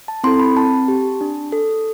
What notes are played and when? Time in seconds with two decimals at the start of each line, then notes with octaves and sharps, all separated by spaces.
0.08 A5
0.24 C4 E4 A4 C6
0.40 B5
0.57 C4 A5
0.88 G4
1.21 D4
1.52 A4